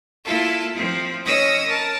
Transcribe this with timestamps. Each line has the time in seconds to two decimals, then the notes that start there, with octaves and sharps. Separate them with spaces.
0.24 A#3 E4 F4 A4 F5
0.74 F3 C4
1.25 C#4 C#5 D#5 D#6 E6 A#6
1.67 A#4 A5